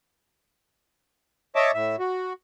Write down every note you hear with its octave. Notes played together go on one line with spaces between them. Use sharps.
C#5 D#5 E5 A5 D6
A2 E5
F#4